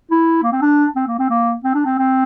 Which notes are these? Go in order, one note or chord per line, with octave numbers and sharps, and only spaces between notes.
E4
A#3
C4
D4
C4
A#3
C4
A#3
C4
D4
C4
C4